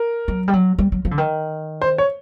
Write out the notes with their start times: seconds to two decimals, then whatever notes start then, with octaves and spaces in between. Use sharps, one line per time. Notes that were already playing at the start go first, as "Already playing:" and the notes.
Already playing: A#4
0.28 F#3
0.48 G3
0.53 F#3
0.78 G3
0.92 F#3
1.05 F3
1.11 D3
1.18 D#3
1.82 C5
1.98 C#5